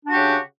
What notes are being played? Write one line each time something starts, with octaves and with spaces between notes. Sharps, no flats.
C#3 D4 F#4 G4